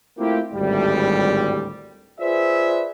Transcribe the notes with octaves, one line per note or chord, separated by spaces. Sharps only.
A3 A#3 C4 E4 F4 G4
G#1 D2 A2 G3
F4 G#4 B4 C5 D5 E5